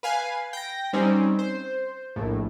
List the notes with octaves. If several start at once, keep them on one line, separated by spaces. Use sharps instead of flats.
B4 F5 G#5
G5 A#6
G3 C4 C#4 D#4
C5
A#1 A2